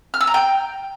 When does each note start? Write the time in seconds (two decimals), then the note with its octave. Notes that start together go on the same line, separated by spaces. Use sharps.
0.14 F6
0.21 E6
0.27 A#5
0.34 G5